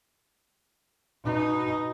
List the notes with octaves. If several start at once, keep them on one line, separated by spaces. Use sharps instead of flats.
B2 D#4